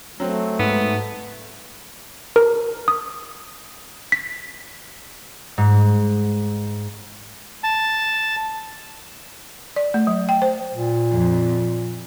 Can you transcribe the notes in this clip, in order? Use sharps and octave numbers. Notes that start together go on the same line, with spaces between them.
F#3 A3 C4
G#2 B3
A#4
D#6
B6
G#2
A5
D5
A3
F#3
G5
C5
A#2
F2